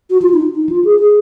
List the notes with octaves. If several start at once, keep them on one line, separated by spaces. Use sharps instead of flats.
F#4
F4
D#4
D#4
F4
G#4
G#4